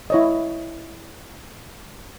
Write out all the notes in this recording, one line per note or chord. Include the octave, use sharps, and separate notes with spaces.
E4 C#5 D#5